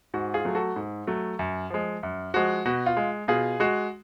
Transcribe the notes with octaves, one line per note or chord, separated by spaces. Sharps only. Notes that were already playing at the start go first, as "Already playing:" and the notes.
G#2 F#4
F4 G#4
F#3 A3
F#4 A4
G#2
F#3 A3
F#2
F3 G#3
F#2
F3 G#3 F#4
B2 F#4
F4
G#3
B2 F4 G#4
G#3 F#4